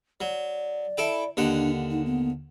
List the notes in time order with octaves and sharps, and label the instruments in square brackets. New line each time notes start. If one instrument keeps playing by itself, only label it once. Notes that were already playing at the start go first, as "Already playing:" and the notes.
[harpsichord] F#3 [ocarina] D5
[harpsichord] E4 A4 G5
[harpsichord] D#2 D3 F#5 [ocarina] D4
[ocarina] D#4
B3